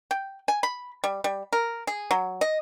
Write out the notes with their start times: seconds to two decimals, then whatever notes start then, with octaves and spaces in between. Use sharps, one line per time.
0.11 G5
0.48 G#5
0.63 B5
1.04 G3
1.24 G3
1.53 A#4
1.87 G#4
2.11 F#3
2.41 D#5